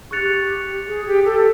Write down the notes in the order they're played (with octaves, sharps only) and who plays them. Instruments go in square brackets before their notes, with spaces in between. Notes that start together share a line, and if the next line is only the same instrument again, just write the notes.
[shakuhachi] G4 G#4 [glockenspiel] C#6 F#6 A6 C#7 F7
[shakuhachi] G#4
G4
A4